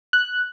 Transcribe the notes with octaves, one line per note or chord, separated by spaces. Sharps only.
F#6